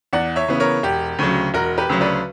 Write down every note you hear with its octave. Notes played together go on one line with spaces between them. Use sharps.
E2 D5 F#5
C#5 E5
C#3 E3 B3
A#4 C#5
E1 G4
D2 C#3 F#3
E1 F#4 A#4
G4 B4
D2 C#3 F#3
B4 D5